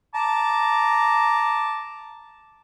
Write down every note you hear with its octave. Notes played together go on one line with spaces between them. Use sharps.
A5 A#5 D6